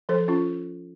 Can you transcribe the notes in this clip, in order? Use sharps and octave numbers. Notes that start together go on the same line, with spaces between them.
F3 A4 C5
C#4 F4